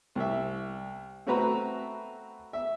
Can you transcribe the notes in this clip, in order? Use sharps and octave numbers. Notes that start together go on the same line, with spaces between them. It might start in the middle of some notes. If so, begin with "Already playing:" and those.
C2 E5
A3 C4 F#4 B4 A#5
E5